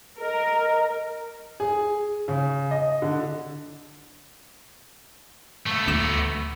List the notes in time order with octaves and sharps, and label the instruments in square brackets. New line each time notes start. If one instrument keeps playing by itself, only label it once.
[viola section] A#4 [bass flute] D#5
[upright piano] G#4
C#3
D#5
D3
[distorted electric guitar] A3 B3
[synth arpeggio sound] D2 D6 E7